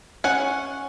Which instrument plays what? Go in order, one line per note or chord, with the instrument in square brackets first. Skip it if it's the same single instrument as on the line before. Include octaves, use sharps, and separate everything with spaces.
[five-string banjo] C#4 F#5